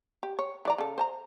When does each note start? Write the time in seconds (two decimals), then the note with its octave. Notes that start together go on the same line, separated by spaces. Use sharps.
0.23 G4
0.39 C#5
0.65 E3 D5 A#5
0.78 C#3 A4
0.98 C5 A5 A#5